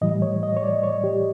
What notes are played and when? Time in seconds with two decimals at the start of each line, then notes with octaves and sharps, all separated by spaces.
0.01 A2 E3 G3 D#5
0.22 C#5
0.43 D#5
0.57 C#5
0.63 D5
0.83 C#5
1.04 G4